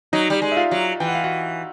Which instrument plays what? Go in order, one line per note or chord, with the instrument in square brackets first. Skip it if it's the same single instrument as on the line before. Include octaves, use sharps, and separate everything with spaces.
[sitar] F#3 [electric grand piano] D#4 D#5
[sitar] G3
G#3
[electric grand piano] E5
F4 F5
[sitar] F#3
[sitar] E3 [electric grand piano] G5
[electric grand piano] F#5
F5
F#4 F#5